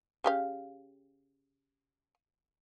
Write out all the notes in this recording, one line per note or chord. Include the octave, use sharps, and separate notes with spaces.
C#3 G4 F5